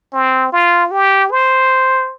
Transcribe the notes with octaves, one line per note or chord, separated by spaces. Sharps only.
C4
F4
G4
C5